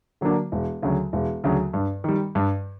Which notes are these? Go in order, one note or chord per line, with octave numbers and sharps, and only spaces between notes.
D3 F#3 A#3 D4
E1
D2 C#3 F#3
E1
D2 C#3 F#3
G2
D#3 G3
G2